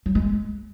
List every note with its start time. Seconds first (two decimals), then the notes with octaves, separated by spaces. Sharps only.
0.06 F#3
0.15 G#3